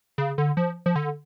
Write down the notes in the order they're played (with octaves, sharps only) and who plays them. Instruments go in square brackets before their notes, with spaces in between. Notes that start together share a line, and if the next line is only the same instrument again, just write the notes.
[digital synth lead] C#3
D3
F3
F3
D3